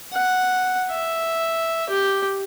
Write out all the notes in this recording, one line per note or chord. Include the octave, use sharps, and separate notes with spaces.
F#5
E5
G4